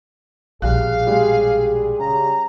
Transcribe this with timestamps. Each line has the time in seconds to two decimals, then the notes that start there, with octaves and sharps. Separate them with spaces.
0.62 A#1 B2 G3 G#4 F5 F#6
1.07 G3 G#3
2.00 C#3 A#5